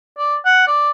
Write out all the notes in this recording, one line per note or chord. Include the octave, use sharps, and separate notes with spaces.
D5
F#5
D5